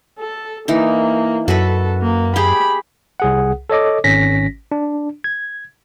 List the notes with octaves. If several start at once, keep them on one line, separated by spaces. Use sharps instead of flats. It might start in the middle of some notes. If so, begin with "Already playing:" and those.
A4
E3 A#3 D#4
F#2 F#4 A4 B4 B5
A#3
G4 G#4 B5
C2 G#4 F#5
A4 C#5 D#5 D6
G#1 C#4 A#6 B6
D4
G#6